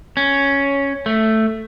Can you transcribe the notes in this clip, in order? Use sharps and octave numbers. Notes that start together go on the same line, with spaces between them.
C#4
A3